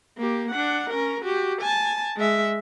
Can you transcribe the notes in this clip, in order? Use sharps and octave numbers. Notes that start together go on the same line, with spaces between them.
A#3 G4
D4 F#5
C#4 A#4
F#4 G4
G#5 A5
G#3 E5